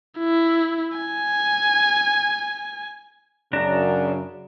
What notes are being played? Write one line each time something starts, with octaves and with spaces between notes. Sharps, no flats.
E4
G#5
F#2 C#3 D4 A#5